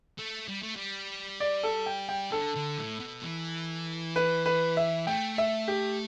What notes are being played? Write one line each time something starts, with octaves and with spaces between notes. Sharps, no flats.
A3
G3
A3
G3
D5
A4
G5
G5
D3 A4
D3
A2
B2
E3
B4
B4
E5
A3 G5
E5
G4